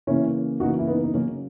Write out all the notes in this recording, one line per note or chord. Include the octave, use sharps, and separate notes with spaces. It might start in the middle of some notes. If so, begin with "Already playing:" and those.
C#3 E3 A#3 C#4 E4
C#3 E3 A#3 D#4 F#4
E4
B3 D#4
D#4
C#3 F#3 A#3 C#4